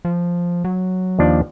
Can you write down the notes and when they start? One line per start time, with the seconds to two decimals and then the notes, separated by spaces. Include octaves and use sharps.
0.05 F3
0.64 F#3
1.19 D#2 F3 D4